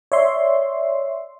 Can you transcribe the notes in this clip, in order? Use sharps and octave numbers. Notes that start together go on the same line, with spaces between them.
C#5 D5 E5 C6